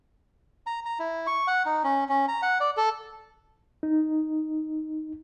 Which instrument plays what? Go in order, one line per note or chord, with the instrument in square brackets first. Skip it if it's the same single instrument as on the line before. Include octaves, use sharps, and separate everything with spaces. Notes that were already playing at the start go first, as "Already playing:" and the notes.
[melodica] A#5
A#5
E4
C#6
F#5
D#4
C#4
C#4
A#5
F#5
D5
A4
[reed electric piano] D#4